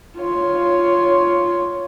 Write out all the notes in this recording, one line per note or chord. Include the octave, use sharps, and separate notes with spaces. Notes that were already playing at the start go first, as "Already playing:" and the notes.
F4 C#5